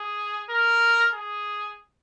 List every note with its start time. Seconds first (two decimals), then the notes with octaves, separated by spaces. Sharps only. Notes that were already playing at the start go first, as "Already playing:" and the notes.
Already playing: G#4
0.50 A#4
1.14 G#4